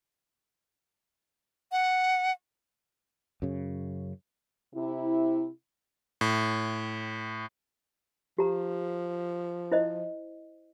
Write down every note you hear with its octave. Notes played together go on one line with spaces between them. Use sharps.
F#5
F#2 C#3
C3 E4
A2
F3 G4 A#5
E4 C5 D#5